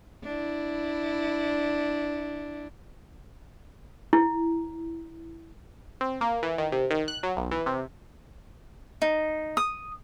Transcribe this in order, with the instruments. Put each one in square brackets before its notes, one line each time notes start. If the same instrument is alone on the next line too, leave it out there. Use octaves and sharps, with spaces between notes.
[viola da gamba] D4 E4
[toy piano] E4
[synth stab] C4
A#3
E3
D#3
C3
D#3
F#6
F#3
B1
E3
C3
[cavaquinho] D#4
D#6